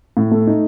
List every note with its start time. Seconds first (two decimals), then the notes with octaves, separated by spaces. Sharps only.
0.17 A2
0.31 A3
0.47 D#4